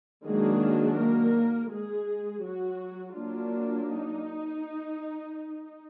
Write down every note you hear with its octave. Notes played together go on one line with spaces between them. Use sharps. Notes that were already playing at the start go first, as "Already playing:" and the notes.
D#3 F#3 G#3 A#3 D4 G#4
A#3 A#4
G#3 G#4
F#3 F#4
F#3 A#3 D4 F4
D#4